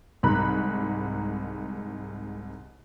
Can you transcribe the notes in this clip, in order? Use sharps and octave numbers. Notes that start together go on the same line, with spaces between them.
C2 G#2 A#5 B5 F#6